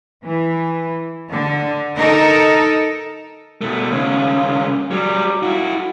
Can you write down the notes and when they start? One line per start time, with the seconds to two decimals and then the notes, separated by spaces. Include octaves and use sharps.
0.25 E3
1.30 D3
1.97 D#4 A4 A#4
3.61 B2 A3
3.91 D#2 C#3
4.91 F#3 G3
5.43 E4 F#4